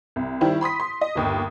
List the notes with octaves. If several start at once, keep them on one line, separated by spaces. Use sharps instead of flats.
C2
D#3 G3 E4 C5
B5 C6 D#6 B6
C6
D#5
G1 D#2 D#6